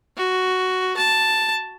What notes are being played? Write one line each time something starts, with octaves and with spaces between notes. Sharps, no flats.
F#4
A5